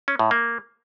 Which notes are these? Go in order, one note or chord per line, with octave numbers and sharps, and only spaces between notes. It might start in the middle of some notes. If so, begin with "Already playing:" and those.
C#4
A2
A#3